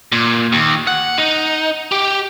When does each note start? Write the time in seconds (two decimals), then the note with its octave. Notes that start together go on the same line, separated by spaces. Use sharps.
0.12 A#2
0.53 D#2
0.87 F#5
1.18 D#4
1.92 G4